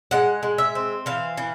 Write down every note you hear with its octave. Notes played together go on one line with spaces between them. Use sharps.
G#3 F#5
G#3
E5
C4
E3 F5
E3